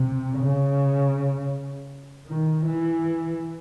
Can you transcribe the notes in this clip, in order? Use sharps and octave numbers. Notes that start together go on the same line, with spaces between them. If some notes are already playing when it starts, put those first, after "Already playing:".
Already playing: C3
C#3
D#3
E3